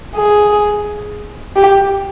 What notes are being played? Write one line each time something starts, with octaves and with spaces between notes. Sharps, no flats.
G#4
G4